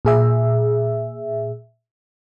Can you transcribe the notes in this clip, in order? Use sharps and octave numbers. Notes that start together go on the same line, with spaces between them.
A#2 G#4 E5